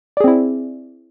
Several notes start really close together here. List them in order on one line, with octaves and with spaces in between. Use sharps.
D5 G#4 C4 E4